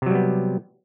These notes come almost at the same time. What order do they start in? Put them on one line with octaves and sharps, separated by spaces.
C3 F#3 G3 B3